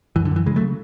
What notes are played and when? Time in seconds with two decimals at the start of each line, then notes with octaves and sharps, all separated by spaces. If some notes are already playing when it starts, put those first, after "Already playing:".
0.16 F#2 E3
0.25 D3
0.31 F#2 E3
0.46 C#3 E3 G#3
0.56 F#3 A3
0.61 C#3